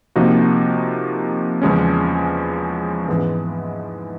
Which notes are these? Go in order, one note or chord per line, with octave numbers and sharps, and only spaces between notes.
C3 F3 A#3 D#4 F#4
E2 C#3 F3 G#3 C#4
G#2 E3 G#3 B3